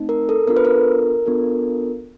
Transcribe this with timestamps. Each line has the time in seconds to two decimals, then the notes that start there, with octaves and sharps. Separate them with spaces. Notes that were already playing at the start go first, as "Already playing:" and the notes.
Already playing: A3 C4 D#4
0.09 A#4
0.29 A4
0.47 B3 D4 F4 A4 A#4
0.57 B4
0.65 A#4
1.26 B3 D4 F4 A4